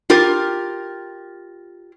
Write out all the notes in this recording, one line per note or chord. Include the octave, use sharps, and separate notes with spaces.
F4 G4 A#4